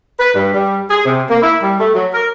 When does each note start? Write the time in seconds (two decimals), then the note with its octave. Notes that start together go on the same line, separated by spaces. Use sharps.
0.20 B4
0.34 G2
0.54 G3
0.90 G#4
1.05 C3
1.30 A#3
1.42 E4
1.63 G3
1.80 A3
1.94 F#3
2.13 A#4